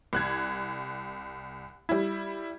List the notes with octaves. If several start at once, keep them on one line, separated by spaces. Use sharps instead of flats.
C2 F#6 G#6
G3 E4